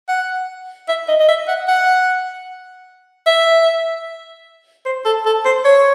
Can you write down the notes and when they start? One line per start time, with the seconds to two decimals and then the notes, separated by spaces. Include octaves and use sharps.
0.08 F#5
0.88 E5
1.08 D#5
1.20 D#5
1.28 E5
1.48 F#5
1.68 F#5
3.26 E5
4.86 C5
5.05 A4
5.25 A4
5.45 C5
5.65 C#5